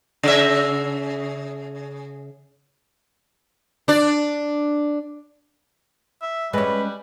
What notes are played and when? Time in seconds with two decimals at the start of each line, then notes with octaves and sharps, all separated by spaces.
0.23 C#3 E5
3.88 D4 D5
6.22 E5
6.53 G3 G#3 C#4 B4